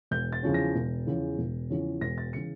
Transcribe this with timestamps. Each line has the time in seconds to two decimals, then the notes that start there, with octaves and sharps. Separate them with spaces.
0.11 E1 G6
0.32 A6
0.43 E2 C#3 F3 C#4
0.54 A#6
0.75 E1
1.07 E2 C#3 F3 C#4
1.38 E1
1.70 E2 C#3 F3 C#4
2.01 E1 A#6
2.18 A6
2.33 C#3 E3 C#7